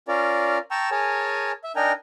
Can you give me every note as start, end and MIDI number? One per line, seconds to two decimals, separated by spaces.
0.08 0.58 61
0.08 0.58 65
0.08 0.58 70
0.08 0.58 74
0.71 0.90 79
0.71 0.90 81
0.71 0.90 82
0.71 0.90 85
0.71 0.90 88
0.91 1.52 68
0.91 1.52 70
0.91 1.52 73
0.91 1.52 80
0.91 1.52 81
1.64 1.72 76
1.76 1.92 62
1.76 1.92 63
1.76 1.92 70
1.76 1.92 79
1.76 1.92 80
1.76 1.92 82